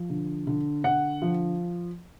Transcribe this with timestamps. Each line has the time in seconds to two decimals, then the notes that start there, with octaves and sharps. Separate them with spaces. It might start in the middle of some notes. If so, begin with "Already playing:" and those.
Already playing: F3
0.10 D3
0.47 D3
0.84 D3 F#5
1.22 F3